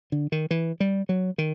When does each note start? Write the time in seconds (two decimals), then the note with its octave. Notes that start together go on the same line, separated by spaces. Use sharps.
0.12 D3
0.32 D#3
0.51 E3
0.80 G3
1.09 F#3
1.38 D#3